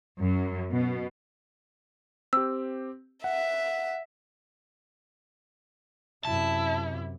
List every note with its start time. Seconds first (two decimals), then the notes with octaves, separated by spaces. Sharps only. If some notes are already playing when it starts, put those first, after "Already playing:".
0.19 F#2
0.71 B2
2.33 C4 G4 E6
3.24 E5 F#5
6.25 F#2 C3 E4 A5